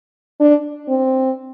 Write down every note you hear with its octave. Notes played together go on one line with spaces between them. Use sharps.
D4
C4